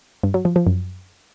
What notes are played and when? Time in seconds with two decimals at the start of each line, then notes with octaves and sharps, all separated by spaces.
0.23 G2
0.34 F#3
0.45 F3
0.56 F3
0.67 F#2